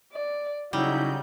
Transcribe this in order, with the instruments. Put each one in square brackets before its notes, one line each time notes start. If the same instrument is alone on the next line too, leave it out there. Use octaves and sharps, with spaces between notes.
[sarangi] D5
[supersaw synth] C#3 D#4 G6 [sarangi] F#3 [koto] G3 [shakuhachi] E4